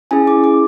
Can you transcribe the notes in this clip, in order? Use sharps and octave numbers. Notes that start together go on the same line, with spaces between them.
C#4 E4 G#4 G#5
D6
D6